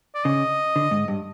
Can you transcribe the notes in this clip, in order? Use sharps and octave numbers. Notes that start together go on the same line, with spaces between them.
D5
C#3 D#5
D3
G#2
G2